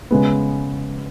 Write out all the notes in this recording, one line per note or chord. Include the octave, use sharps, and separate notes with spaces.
C#3 G#3 B3